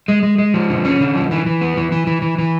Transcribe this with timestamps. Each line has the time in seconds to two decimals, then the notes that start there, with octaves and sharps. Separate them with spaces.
0.08 G#3
0.23 G#3
0.38 G#3
0.54 F3
0.70 D3
0.85 C#4
1.01 D3
1.15 F3
1.31 E3
1.46 E3
1.61 B3
1.77 E3
1.92 E3
2.07 E3
2.22 E3
2.38 E3